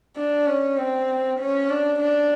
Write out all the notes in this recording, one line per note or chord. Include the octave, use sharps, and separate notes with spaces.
D4
C#4
C4
C#4
D4
D4